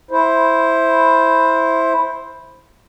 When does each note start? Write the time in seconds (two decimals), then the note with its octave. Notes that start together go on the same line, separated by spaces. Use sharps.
0.11 E4 C5